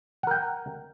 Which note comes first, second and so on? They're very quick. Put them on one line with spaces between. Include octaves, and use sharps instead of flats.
F#5 A#4 G5